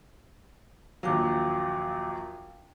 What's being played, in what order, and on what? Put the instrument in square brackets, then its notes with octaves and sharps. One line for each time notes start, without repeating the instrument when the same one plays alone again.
[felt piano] A#1 D#2 F#3 [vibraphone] F5 G5 D6